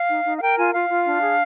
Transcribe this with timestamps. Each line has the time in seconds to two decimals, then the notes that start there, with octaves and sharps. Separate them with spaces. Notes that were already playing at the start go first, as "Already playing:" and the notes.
Already playing: F5
0.09 D#4
0.25 D#4
0.37 F5
0.41 A#4 G5
0.57 F4 G#5
0.73 F4 F5
0.89 F4
1.05 D4
1.22 G#4